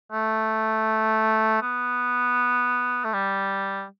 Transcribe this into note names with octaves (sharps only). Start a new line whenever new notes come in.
A3
B3
A3
G3